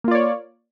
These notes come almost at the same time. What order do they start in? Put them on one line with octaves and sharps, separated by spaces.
A#3 F4 D5 C#5